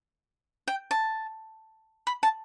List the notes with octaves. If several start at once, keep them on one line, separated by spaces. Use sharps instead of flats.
G5
A5
B5
A5